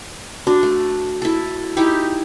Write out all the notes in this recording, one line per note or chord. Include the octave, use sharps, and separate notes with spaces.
D4 F#4
A3
E4 A4
D#4 E4 G4